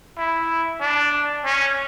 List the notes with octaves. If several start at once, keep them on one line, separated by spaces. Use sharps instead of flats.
E4
D4
C#4